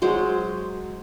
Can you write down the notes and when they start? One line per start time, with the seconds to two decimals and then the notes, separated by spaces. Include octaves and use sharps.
0.02 F#3 G#3 C5